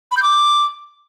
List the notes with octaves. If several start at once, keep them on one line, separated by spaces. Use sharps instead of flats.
B5
G6
D6